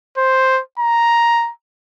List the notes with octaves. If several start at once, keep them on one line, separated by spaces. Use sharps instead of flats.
C5
A#5